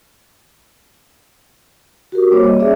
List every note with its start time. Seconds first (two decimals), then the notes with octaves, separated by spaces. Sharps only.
2.12 F#4 G4 A#4
2.31 G3 A#3 C4 C5 C#5 D6
2.43 C#5 D#5
2.59 G3 C#4 G#4 C#5 D5 E5